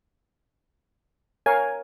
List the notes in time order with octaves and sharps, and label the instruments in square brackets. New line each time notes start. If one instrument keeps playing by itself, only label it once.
[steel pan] A#4 C#5 F5 [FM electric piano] G#5